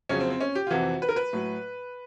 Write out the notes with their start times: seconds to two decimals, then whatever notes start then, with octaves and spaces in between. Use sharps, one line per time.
0.09 F2 C#3 F#3 C#4
0.20 C4
0.30 C4
0.41 C#4
0.55 G4
0.67 F4
0.71 F2 C3 E3 F#4
1.02 B4
1.09 A#4
1.16 B4
1.33 A2 F#3